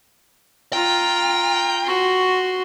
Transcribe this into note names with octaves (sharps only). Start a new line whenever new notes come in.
F4 G5 A#5
F#4 C6